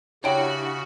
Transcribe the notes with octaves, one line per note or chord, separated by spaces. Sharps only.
C#3 D4 E4 F#4 G4 C#5 G5 D7